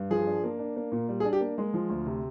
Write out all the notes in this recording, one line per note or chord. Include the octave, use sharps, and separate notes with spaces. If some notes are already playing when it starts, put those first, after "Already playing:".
Already playing: G2
F3 G#4
D4
A#3
D4
A#3
A#2
G3
G#4
D4
G4
A#3
G#3
F3
D2
C3